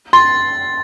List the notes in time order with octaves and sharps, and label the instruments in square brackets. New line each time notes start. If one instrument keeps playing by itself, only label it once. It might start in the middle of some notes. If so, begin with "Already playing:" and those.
[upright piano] C6 [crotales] A6